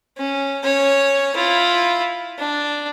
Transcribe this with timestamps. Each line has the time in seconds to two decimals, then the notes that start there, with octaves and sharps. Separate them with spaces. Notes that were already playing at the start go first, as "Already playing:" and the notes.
0.17 C#4
0.64 C#4 C#5
1.35 E4 F4
2.39 D4